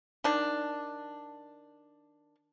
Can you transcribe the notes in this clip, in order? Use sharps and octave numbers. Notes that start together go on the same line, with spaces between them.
D#3 D4